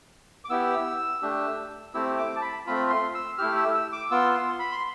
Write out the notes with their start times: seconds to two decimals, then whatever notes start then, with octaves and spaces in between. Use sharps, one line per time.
0.45 D6
0.50 B3 E4 G4 E6
1.22 A3 D4 G4
1.94 A3 C4 E4 G4 E6
2.18 D6
2.36 A5
2.42 B5
2.67 A3 C4 F4 B5
2.90 C6
3.15 E6
3.38 A3 E4 G4 F6
3.56 E6
3.75 E6
3.92 D6
4.11 B3 F4 E6
4.34 C6
4.59 B5
4.72 C6